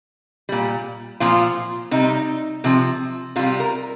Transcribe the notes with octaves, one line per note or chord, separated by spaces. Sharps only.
A#2 G3
A#2 F3 F4
C3 G3 D#4
C3 F3
C3 G3 F4
A#4